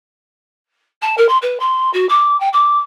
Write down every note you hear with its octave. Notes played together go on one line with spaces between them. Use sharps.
A5
A#4
C6
B4
C6
F#4
D6
G5
D6